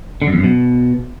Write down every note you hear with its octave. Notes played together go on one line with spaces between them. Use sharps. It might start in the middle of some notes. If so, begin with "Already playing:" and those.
D3
F#2
E2
F#2
B2